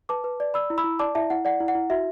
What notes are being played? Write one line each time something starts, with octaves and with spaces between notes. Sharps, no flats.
B4 A5 D6
B4
D5
D5 B5 E6
E4
B5 E6
E4
D5 A5 D6
E4 E5 A5
E4 F#5
D5 F#5
E4
F#5
E4
F#4 E5